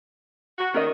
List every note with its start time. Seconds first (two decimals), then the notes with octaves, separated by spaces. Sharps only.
0.58 F#4
0.74 D#3 C#4 A#4 D#5